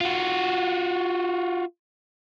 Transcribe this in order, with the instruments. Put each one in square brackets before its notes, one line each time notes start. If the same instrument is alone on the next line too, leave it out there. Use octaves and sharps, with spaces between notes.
[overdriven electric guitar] F4 F#4